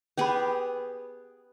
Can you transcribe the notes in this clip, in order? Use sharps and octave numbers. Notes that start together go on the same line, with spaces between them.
B3 C#4 G4 G#4 B5